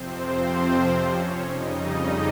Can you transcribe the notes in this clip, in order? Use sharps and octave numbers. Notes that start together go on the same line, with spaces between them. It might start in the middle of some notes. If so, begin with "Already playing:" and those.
Already playing: F2 C3 F3 C4 C5
C#4 C#5
F2 C#3 G3 D#4 D#5